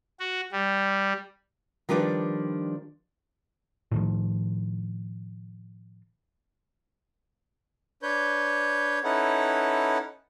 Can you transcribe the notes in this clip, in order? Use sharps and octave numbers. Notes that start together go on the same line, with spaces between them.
F#4
G3
D#3 F3 G3 D4 B4 D5
A2 D#3 F3
D4 B4 C#5 G6
C#4 D#4 E4 A4 B4 F#5